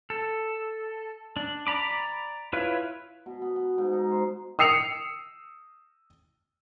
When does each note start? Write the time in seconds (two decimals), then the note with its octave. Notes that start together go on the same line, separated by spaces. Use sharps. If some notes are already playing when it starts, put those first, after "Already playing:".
0.10 A4
1.37 D4
1.67 D5 A#5 B5 D6
2.53 E4 F4 B4 C#5 E5
3.26 B2
3.42 B3
3.56 B3
3.78 G#2
3.93 D#4
4.11 C5
4.59 D#6 E6 C7 C#7 F7